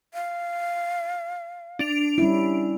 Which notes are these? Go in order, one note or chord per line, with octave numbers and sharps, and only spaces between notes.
F5
D4 D7 F7
G3 C#4 E4